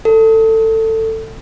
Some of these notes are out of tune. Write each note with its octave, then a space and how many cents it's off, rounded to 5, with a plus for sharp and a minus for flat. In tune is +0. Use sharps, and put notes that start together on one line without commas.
A4 +20